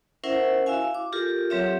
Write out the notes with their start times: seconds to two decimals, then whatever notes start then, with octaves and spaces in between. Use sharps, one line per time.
0.24 C#4 E4 A#4 C5 E5 F#5
0.66 E4 F#4 E5 F5 G#5
0.95 D6
1.13 F4 G4 A4 A#4
1.50 F#3 C4 G4 C#5 E5